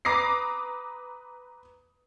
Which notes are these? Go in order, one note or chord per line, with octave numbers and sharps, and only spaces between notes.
B4 A#5 D6 D#6 A#6 C7